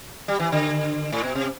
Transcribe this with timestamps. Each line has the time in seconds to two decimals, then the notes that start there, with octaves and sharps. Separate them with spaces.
0.28 G3
0.39 E3
0.52 D3
1.12 A2
1.24 B2
1.35 C3